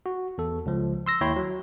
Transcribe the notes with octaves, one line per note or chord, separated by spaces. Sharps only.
F#4
E2 A4
C#2 F3
C6 E6 A#6
D#2 E4 C#5 G5 B5 C6
F#3